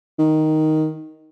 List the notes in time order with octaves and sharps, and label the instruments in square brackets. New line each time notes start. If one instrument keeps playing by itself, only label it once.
[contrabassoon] D#3